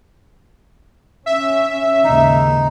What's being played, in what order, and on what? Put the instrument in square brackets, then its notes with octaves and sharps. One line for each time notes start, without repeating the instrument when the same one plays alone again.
[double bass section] C#4 [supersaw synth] E5
[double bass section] D#2 G#2 C#3 [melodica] D#4